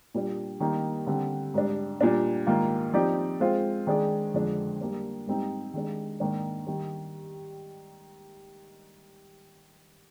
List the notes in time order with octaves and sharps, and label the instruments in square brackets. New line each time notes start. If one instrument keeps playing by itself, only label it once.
[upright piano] A#2 G3 D4
D#3 G3 A#3 D#4
D3 G3 C4
G#2 G3 D4
A#2 G3 D4
G#2 D#3 A#3 F4
F3 C4 D#4 G4 D5
G#3 C4 F4 C5
D#3 G#3 D4 G#4 D5
F2 D3 G#3 D4
G3 A#3 D4
G#2 G3 C4 D#4
D#3 G#3 D4
G#2 D#3 A#3 D4
D#3 G3